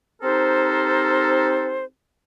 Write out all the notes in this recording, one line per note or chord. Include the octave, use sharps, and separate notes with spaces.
C4 D#4 G4 A4 A#4 C5